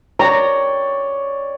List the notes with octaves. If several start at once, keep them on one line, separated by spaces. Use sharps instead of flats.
C#5 D5 G5 A#5